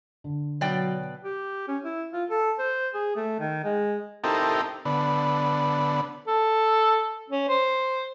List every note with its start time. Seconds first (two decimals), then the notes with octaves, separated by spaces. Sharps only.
0.24 D3
0.61 B2 F#3 D5 G5
1.24 G4
1.68 C#4
1.85 E4
2.13 F4
2.30 A4
2.59 C5
2.94 G#4
3.16 A3
3.40 D#3
3.64 G#3
4.24 C4 D#4 E4 G4 A4 A#4
4.85 D3 B3
6.27 A4
7.30 C#4
7.48 C5